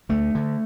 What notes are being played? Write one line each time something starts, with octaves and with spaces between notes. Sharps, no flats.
D2 A3
D3